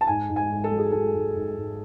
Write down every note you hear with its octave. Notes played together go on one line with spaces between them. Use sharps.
A5
G#2 G#5
G#2
G#5
G#2
A4
F#3
G#4
F#3 A4
G#2
G#2
G#2